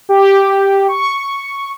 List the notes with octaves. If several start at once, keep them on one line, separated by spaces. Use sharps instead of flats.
G4
C#6